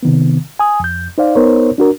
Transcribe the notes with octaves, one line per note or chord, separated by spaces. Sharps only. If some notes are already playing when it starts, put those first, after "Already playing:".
C3 D#3 B3
G#5 D#6
F2 G6
D#4 C5 D5 F5
B3 D#4 A#4 C5 C#5
D4 F#4 A#4